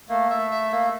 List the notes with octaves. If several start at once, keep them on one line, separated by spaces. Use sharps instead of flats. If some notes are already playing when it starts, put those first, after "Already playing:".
A3 A#3
A3 E5
E5
A#3